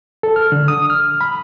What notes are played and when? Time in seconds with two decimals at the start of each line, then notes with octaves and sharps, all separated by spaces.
0.23 A4
0.36 F6
0.52 D3
0.68 D#6
0.90 F6
1.21 B5